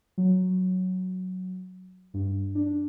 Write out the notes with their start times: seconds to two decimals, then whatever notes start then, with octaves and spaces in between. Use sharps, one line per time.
0.18 F#3
2.14 G2
2.55 D4